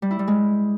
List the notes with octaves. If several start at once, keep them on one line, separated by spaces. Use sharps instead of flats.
G3
E4
G3
G#3